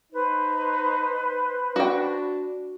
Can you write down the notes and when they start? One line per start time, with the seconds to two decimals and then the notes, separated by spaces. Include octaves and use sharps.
0.12 D#4 B4 C5
1.76 D4 F#4 G5